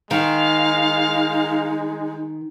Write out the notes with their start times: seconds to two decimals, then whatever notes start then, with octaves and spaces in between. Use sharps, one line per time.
0.11 D#3 G#3 D#4 F5